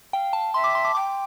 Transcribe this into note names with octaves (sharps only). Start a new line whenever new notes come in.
F5 G5
A5
E5 C6
D6
C6
D6
G5 D6